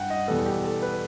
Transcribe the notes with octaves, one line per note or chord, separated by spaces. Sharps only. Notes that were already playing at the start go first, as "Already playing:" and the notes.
Already playing: G2 F#5 G5
D#5
E2 B2 G3 B3 A4
G4
A4
B4